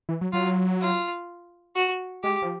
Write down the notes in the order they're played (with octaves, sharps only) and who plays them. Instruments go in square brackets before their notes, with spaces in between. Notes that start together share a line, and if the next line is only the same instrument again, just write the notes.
[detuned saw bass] E3
F#3
[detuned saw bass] F#3 [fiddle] F4
[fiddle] F4
F#4
[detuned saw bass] G#3 [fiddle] G4
[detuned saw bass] F3